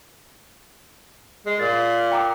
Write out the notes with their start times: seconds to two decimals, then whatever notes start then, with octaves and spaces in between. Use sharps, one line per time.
1.46 G#3
1.60 A#2 A6
2.12 G5 A#5 D6